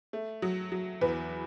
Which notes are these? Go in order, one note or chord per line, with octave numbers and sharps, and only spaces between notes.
A3
F#3
F#3
E2 B4